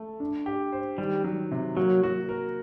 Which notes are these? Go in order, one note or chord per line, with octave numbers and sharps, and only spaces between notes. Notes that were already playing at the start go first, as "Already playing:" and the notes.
Already playing: A3
D4
G4
C5
D#3 G3
F#3
C3
F#3 A#3
F#4
A#4